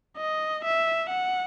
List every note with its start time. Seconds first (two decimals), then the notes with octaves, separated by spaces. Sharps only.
0.17 D#5
0.64 E5
1.10 F#5